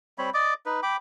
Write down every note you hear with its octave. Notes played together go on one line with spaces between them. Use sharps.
G3 C4 C#5 B5
D5 D#5 D6
D#4 B4
G5 B5 D6